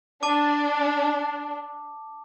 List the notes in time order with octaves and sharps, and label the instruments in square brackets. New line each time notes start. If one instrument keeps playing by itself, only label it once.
[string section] D4 [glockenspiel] A5 D6